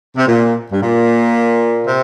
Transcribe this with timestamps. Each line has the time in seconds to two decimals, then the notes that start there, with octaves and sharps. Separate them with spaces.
0.17 C3
0.26 A#2
0.72 G2
0.80 A#2
1.88 C3